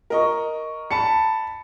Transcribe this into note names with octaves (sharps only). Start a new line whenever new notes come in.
A#4 D#5 C#6
A5 B5 C#7